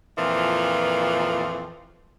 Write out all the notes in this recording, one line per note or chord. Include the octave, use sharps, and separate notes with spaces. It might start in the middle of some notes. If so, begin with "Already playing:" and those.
F2 A#2 E3 F3